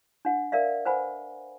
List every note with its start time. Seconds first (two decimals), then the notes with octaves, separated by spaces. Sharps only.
0.25 D4 F#5
0.52 A#4 D5 E5 F5
0.85 B4 C5 F#5 G#5 B5